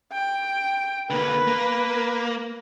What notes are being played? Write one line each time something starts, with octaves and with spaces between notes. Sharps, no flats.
G5
D3 A#3 B4
A#3